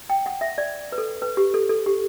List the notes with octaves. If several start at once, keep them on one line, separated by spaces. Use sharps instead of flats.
G5
F#5
E5
D5
B4
A4
B4
G4
A4
A4
G4